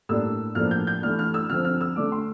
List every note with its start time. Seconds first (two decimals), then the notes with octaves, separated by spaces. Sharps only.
0.09 A2 G3 A#3 D4 E6
0.55 A2 F3 A#3 D4 F6
0.71 G6
0.87 G6
1.02 E3 A3 D4 F6
1.19 F6
1.34 E6
1.49 D3 F3 C4 F6
1.65 F6
1.81 E6
1.96 D3 A3 D4 D6
2.12 C6